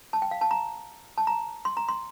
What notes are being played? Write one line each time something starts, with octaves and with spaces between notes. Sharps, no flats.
A5
G5
F5
A5
A#5
A5
A#5
C6
A#5
C6